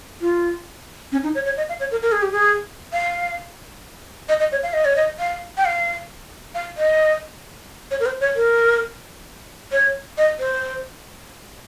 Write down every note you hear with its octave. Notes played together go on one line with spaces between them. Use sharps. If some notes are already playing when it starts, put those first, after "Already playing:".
F4
C#4
D#4
C#5
C#5
D#5
F5
C#5
A#4
A#4
G#4
G4
G#4
F5
D#5
D#5
C#5
F5
D#5
C#5
D#5
F5
G5
F5
F5
D#5
C#5
A#4
C5
C#5
A#4
C#5
D#5
C5